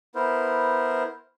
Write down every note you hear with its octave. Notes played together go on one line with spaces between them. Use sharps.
B3 E4 A#4 C5